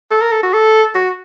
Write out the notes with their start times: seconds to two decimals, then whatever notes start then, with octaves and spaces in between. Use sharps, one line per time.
0.11 A4
0.21 A#4
0.32 A4
0.43 F#4
0.53 A4
0.95 F#4